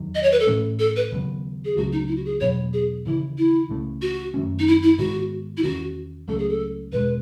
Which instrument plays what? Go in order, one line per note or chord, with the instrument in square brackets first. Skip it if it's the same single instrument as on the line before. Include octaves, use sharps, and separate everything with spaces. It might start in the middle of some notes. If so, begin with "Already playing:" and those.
Already playing: [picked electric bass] E2 D#3 F#3
[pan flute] D#5
C#5
B4
A4
[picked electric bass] A2 E3 A3 C#4
[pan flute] A4
B4
[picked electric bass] D#2 C#3 F#3 B3
[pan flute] G#4
[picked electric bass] C#2 C#3 F#3 A3 [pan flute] F#4
[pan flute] D#4
E4
F#4
G#4
[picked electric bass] E2 B2 F#3 B3 [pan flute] C#5
[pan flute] G#4
[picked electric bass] D#2 C#3 E3 [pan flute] E4
[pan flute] E4
[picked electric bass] C#2 C#3 E3 A3
[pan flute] F#4
[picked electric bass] F#2 D#3 A3 C#4
[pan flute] D#4
E4
E4
[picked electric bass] G#2 D#3 G#3 B3 [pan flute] F#4
[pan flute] E4
[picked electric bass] E2 D#3 A3 C#4 [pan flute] F#4
[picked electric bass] C#2 C#3 F#3 A3 [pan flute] A4
[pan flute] G#4
A4
[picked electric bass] E2 B2 G#3 [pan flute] B4